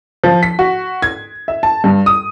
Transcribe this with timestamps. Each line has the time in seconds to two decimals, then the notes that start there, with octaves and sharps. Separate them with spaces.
0.24 F3
0.43 B6
0.59 F#4
1.02 G#6
1.48 E5
1.63 A5
1.84 G2
2.06 D#6